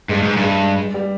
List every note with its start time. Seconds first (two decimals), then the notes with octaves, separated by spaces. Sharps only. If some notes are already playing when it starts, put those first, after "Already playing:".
0.09 G2 G#3
0.23 G#2
0.37 G2
0.44 G#3
0.94 G3